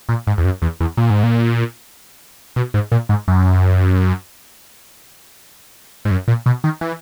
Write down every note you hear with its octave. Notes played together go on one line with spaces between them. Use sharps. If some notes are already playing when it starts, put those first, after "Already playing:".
A#2
G#2
E2
F#2
E2
E2
A#2
G#2
A#2
B2
G#2
A#2
G#2
F#2
G#2
F#2
A#2
B2
D#3
E3